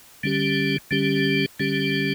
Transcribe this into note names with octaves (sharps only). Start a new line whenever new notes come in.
D3 G3 C#4 G4
D3 G3 C#4 G4
D3 G3 C#4 G4